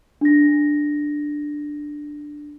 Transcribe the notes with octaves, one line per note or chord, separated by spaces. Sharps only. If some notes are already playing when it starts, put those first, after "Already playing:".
D4 A#6